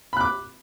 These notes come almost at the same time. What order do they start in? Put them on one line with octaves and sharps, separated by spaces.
B5 F#6 D6